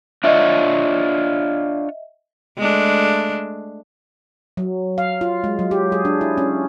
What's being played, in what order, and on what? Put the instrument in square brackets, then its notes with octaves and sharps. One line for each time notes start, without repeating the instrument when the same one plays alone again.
[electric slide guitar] D4 F4 C#5 [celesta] D#5 E5
[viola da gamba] G#3 A3 D4
[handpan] F#3
F5
F4
G#3
F#3
G4
G#4
D4
E4
C#4